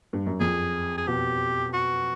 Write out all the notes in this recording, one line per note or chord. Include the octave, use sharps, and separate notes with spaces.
G2
F#2
F2 G#4
G#4
B2 G4
F#4